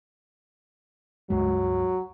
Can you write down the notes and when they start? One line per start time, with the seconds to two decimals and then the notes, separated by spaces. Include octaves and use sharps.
1.30 C#2 G2 F#3 G#3